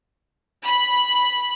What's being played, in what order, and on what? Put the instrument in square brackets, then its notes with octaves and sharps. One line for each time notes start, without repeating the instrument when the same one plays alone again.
[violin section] B5